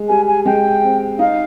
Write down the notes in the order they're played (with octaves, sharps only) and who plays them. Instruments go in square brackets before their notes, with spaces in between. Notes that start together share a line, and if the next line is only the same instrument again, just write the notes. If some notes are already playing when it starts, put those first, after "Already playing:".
Already playing: [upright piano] G#3
[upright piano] G3 [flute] G#5
[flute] G#5
[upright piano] G#3 [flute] G5
[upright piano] C4
[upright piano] D#4 [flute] F5